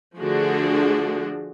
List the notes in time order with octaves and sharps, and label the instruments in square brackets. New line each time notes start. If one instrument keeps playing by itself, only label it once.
[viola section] D3 F3 A3 D4 F#4 G#4